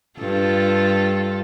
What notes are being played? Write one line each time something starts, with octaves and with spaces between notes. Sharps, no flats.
G2 F4 A4